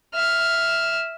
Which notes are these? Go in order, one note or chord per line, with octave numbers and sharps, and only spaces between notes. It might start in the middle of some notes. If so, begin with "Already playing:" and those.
E5 F6